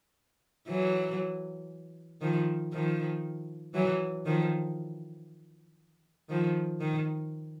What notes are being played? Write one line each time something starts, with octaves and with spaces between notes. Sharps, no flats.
E3 F#3
D#3 F3
D#3 F3
E3 F#3
D#3 F3
D#3 F3
D#3